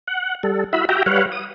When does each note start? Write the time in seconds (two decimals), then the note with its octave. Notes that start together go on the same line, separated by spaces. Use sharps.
0.07 F#5
0.43 G3 A4
0.73 E4 F#4 E5 B5
0.89 F#4 G4 E5 G5 A#5
1.06 G3 B4 C#5 F5 F#5
1.32 D#6